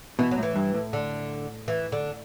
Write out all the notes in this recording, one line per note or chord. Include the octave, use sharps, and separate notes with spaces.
B2 E3
F#3
A2 E3
G2
A2
D3
E3
D3